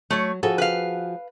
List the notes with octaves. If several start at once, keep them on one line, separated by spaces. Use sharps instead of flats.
F#3 A3 C#5
F3 F#4 G#4 A4
B4 F5